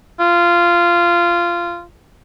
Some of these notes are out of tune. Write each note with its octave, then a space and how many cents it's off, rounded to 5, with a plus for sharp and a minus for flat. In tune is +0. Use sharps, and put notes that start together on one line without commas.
F4 -15